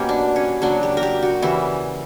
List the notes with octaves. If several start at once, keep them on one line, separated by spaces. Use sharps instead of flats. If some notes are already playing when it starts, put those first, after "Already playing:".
Already playing: B2 A#3 C#4 G4
D4
C#4
C#3 F#3 A#3 D4
G4
A#4
G4
F#4
C#3 E3 G3 E4